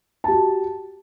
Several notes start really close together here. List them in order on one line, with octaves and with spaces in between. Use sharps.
A5 G4 F#4